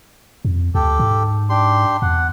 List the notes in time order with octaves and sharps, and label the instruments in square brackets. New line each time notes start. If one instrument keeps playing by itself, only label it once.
[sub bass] F2
[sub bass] D2 [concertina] G4 A4
[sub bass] G#2
[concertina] D4 G4 C6
[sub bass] E2 [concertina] F#5